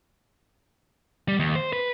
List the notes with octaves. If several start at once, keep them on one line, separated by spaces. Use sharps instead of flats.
G3
D#2
C5
B4